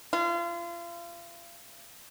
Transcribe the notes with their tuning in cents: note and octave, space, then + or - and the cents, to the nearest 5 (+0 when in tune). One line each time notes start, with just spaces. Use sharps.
F4 -35